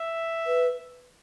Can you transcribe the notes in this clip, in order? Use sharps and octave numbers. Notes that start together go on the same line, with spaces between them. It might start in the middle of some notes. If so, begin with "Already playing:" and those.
Already playing: E5
B4